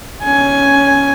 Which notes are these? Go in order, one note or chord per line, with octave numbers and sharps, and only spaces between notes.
C#4 G#5